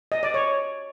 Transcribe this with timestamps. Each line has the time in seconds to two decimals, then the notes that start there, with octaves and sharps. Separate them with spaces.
0.12 D#5
0.23 D5
0.34 C#5